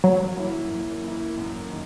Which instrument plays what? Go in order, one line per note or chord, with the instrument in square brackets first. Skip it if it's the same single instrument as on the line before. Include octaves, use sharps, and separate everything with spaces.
[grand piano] F#2 [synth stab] F#3
[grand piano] E3 A#3 E4
F#2
E3 A#3 E4
F#2
D#3